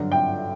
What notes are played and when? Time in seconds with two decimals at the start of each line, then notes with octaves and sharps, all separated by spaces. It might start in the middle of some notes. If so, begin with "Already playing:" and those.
Already playing: G2 D3 F#3
0.12 G5